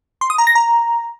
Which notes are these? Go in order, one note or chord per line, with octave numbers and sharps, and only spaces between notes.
C6
D#6
A#5
A#6
A#5